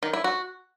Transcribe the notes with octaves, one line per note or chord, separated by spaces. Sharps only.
D#3
E4
F#4